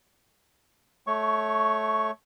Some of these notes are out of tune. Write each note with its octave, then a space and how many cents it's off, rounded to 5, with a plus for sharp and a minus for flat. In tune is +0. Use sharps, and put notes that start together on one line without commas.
A3 -15 C#5 +5 C#6 +0